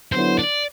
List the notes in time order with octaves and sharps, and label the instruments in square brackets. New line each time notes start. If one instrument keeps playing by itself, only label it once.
[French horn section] D3 F#3 B3 E4 [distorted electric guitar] C5
[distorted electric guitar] D5